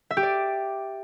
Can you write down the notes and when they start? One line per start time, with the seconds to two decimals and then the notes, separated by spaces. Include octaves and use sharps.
0.11 E5
0.17 G4
0.23 D5